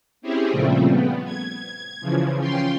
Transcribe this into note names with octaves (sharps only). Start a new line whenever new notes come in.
C4 C#4 E4 G4 G#4
A#2 C#3 F3 G3 A3 C4
B3
G#6
C#3 E3 F3
C#4 F4 G5 C6